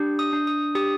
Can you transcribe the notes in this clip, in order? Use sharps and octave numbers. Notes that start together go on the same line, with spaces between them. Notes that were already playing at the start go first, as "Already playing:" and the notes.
Already playing: D4 G4
D#6
D4
D#6
G4 D#6